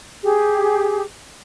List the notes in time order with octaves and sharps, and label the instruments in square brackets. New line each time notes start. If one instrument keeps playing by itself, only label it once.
[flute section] G4 G#4